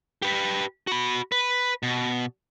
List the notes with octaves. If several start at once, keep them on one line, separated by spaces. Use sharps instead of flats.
G4 B4
F#4 B5
B4
B2